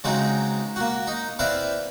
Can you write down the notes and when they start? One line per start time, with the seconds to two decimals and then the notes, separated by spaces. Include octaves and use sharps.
0.04 C#3 F#3 G#3 C4 D#4
0.76 A#3 F#4
1.07 D#4
1.39 C4 E4 B4 D5 E5 F5